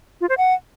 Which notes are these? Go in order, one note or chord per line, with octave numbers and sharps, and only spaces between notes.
F4
C5
F#5